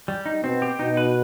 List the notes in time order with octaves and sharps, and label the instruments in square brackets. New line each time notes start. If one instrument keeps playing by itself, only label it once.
[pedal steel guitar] G3
D#4
[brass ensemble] B2 [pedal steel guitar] C4
[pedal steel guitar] G4
[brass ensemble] B2 [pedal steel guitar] D#4
[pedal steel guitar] B4